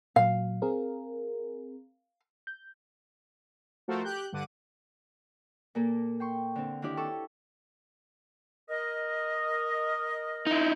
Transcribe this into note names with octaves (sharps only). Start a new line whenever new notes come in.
A#2 F#3 F5
C4 G#4 A#4
G6
F3 A3 F#4 A4 A#4 C5
G4 F#6 G6
G2 D3 F#5 D6 D#7
A#2 A#3 A4
G5 C6 C#6
D3 C4
D#3 D4 E4 G4 D5
A4 C#6 E6
A#4 D#5
D#4 E4